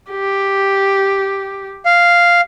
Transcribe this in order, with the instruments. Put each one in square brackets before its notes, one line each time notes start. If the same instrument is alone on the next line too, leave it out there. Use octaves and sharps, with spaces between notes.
[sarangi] G4
[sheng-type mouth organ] F5